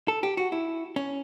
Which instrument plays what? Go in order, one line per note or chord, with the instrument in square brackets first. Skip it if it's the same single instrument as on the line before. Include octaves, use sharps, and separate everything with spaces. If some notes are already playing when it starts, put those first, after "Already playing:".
[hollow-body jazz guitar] A4
G4
F#4
E4
C#4